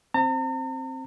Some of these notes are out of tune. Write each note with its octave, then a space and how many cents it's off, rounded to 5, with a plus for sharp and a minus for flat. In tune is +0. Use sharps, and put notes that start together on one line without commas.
C4 +10 A#5 -45